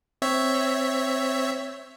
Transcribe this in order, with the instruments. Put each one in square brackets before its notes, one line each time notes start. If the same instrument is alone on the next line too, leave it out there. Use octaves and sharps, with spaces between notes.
[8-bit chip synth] C4 C#5 E5